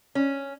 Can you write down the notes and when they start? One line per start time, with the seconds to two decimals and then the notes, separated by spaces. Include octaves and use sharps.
0.15 C#4